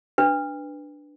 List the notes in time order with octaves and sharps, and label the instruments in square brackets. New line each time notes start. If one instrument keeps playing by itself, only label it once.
[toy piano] D4 B4